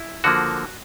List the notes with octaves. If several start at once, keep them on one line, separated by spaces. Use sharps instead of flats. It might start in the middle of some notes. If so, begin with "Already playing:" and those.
Already playing: E4
D3 F3 A#3 F#4